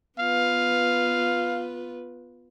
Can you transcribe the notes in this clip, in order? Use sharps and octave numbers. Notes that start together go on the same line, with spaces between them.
B3 F4 B4 F5